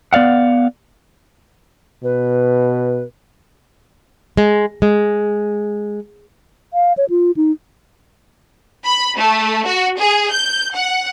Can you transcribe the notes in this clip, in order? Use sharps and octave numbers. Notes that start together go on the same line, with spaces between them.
B3 D5 F5 F#5
B2 B4
G#3
G#3
F5
C#5
F4
D#4
B5
A3
F#4
G#4
G6
F#5